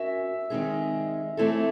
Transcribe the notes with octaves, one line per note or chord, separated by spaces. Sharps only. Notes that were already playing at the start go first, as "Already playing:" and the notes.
Already playing: C#4 F#4 A#4 E5
D#3 G#3 C4 D#4 G#4
E3 A3 C4 E4 A4